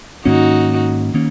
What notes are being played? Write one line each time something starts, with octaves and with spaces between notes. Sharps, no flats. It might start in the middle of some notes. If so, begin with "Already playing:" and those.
G#2 D#3 A#3 C#4 D#4 F#4
D#3 A#3 C#4